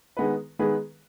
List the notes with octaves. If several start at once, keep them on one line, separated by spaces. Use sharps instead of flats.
D#3 G#3 B3 G#4 B4
D#3 G#3 B3 G#4 B4